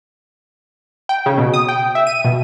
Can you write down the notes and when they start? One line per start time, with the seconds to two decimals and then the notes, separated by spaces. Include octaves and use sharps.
1.09 G5
1.26 C#3
1.38 B2
1.54 D#6
1.68 G5
1.95 E5
2.07 D#7
2.24 B2